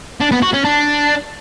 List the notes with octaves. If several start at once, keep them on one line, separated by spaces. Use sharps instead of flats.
D4
B3
F#4
C#4
D4